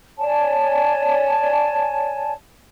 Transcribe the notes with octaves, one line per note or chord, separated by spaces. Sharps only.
C#5 D5 G#5 A5